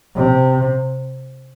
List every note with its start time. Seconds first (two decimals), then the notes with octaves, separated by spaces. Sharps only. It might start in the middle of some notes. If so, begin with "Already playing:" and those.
0.16 C3